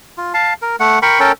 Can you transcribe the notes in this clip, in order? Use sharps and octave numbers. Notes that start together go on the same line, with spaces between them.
F4
F5 A5
A#4
A3 F#5
A#4 G5 B5 C#6
C#4 A4 A#4 G5